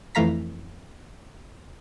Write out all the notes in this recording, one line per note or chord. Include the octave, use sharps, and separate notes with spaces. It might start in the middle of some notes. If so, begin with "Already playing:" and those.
F2 E3 A3 F5 A#5 B6